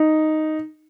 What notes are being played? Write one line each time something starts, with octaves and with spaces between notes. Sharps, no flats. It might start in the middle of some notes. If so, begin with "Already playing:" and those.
Already playing: D#4